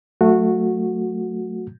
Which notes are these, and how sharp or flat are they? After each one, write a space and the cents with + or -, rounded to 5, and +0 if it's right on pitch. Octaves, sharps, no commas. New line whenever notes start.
F#3 +0 A3 +15 F#4 -15